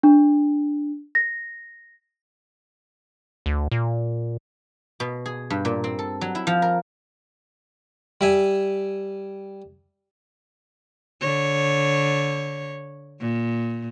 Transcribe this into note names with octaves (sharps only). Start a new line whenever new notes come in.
D4
A#6
D2
A#2
B2
G#4
G2
A#2
C4
A4
F#3
E4
F3
A#4
G3 E5 G#5
D3 C#5
A#2